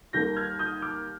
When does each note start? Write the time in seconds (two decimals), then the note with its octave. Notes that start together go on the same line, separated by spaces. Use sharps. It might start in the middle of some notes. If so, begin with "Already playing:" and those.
0.13 D#2 D#3 G3 A#3 G6 A#6
0.36 F6 G#6
0.59 D#6 G6
0.82 D6 F6